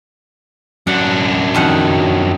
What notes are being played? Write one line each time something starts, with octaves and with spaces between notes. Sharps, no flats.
F#2 D4 F#5
F2 D#3 F#5